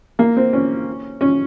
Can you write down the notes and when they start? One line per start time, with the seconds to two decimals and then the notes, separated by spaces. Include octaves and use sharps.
0.19 A#3
0.37 C4
0.53 C#4
1.21 C#4